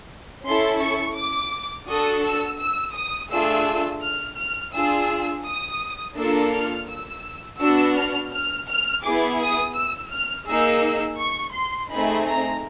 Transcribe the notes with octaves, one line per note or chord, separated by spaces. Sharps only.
C#4 E4 A4 C6
C#6
D6
D4 F#4 A4 D#6
E6
E6
D#6
A3 D4 F4 G#4 E6
F6
F6
D4 F4 G#4 E6
D#6
A#3 D4 F4 A4 E6
F6
E6
B3 D4 F#4 E6
F6
F6
F6
B3 E4 G#4 D6
D#6
E6
F6
A#3 D#4 G#4 E6
C#6
C6
A3 C4 D#4 G#4 B5
A#5